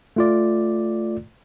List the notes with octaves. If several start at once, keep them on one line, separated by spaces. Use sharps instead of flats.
A3 F4 D5